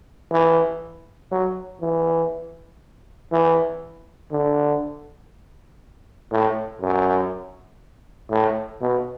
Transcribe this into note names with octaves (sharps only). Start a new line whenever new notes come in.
E3
F#3
E3
E3
D3
A2
F#2
A2
B2